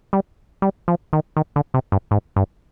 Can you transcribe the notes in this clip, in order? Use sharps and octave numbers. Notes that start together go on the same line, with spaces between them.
G3
G3
F3
D#3
D#3
D3
C3
G2
G#2
G2